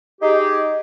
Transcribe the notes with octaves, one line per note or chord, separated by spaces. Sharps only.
D#4 G4 G#4